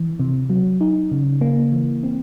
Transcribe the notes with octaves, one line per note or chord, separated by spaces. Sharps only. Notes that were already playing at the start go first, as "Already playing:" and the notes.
Already playing: E3
C3
F#3
D#4
C#3
A#3
E3
C4